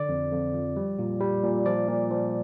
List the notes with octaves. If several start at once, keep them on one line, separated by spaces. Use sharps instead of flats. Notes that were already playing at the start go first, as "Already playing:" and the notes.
Already playing: D3 D5
F2
F2
F3
G3
A#2
G3
A#2
F3 D5
A#2
F3